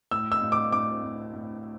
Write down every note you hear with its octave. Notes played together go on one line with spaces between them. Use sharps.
A2 E6
E6
A2
D6
A2 D6
A2
A2